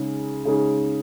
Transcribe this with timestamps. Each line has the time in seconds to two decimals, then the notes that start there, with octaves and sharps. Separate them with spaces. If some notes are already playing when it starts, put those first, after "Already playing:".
Already playing: C#3 G#3 D#4
0.45 C#3 G#3 D#4 G#4